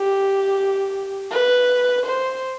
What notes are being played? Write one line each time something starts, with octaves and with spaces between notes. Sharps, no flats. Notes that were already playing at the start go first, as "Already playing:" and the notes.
Already playing: G4
B4
C5